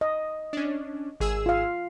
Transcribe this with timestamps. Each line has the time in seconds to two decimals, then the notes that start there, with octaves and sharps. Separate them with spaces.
0.01 D#5
0.53 C#4 D4
1.20 G#1 G#4 E6
1.46 F4 F5